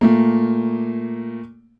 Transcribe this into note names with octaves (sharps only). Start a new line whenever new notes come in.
A#2 A3 A#3